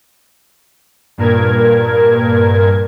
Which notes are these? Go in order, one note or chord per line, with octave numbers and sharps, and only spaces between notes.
G2 A#2 A#4 G#6